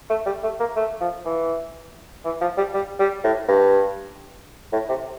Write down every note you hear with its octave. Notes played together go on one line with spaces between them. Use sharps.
A3
G3
A3
A#3
A3
F3
E3
E3
F3
G3
G3
G3
A2
G2
A2
C3